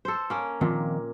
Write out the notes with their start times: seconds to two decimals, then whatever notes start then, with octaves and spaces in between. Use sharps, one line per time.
0.05 A4 C5
0.30 A#3 C#4
0.61 A#2 D#3 F3 C4